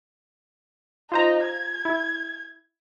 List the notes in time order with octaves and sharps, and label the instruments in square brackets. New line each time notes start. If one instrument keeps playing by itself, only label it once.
[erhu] D#4 [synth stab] F4 C5 A#5
[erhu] G#6
[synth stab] E4